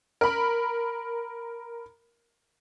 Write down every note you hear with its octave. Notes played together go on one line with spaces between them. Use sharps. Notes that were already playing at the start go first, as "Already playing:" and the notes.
A#4 B5